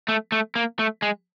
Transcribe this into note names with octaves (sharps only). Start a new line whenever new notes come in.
A3
A3
A#3
A3
G#3